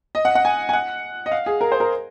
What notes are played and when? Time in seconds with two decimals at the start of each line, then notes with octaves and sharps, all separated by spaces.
0.15 D#5
0.25 F#5
0.35 F#5
0.45 G#5
0.69 G#5
0.73 F#5
1.26 D#5
1.32 F5
1.46 G#4
1.61 A#4
1.72 C5
1.80 A#4